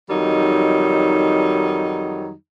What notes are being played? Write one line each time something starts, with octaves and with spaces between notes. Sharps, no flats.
F2 D#3 F#3 G3 D#4